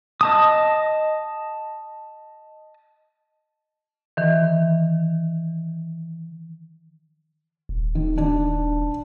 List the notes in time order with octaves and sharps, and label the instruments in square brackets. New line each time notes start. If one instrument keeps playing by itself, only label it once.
[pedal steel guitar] D#5 A5 D#6
[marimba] D#3 E3
[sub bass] D#1
[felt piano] D#3
D4